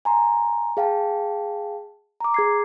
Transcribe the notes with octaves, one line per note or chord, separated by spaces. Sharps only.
G#5 A#5 C6
G#4 F5 G5 A5
A#5 D6
G#4 G#6 C7